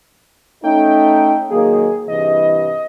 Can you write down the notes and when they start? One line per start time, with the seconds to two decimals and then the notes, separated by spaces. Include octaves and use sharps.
0.63 A3 C#4 D#4 G5
1.50 D#3 F#3 A#3 G#4
2.08 G2 C3 E3 D#5